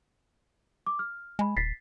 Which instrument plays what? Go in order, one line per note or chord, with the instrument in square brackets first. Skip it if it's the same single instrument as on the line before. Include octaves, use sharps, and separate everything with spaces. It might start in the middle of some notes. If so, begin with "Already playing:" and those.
[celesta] D6
F6
[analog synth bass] G#3 [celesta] G#5 B5
[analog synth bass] D#1 [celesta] A6 B6 C7